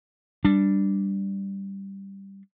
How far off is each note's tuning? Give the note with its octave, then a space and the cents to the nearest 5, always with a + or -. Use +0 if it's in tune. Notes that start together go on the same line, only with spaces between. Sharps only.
G3 +0 D4 +0